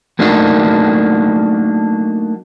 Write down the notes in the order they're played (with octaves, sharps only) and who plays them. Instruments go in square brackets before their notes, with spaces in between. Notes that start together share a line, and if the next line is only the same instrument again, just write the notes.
[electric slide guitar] F#3 A3 A#3 D4 D#4 F#4